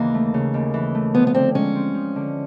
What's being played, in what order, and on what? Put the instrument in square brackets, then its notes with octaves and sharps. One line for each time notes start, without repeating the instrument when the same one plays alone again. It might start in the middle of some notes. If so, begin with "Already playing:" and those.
Already playing: [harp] D#2 C#3 E3 [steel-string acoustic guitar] A#3
[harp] A3
C#3
D#2
E3
A3
[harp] F3 [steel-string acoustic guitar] B3
[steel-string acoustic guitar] B3
[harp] D3 [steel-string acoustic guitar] C4
[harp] G#3 [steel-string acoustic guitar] C#4
[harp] C4
F3
D3